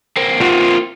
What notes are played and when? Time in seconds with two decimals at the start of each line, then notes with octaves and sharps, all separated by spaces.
0.17 A#3 C4
0.41 F4 F#5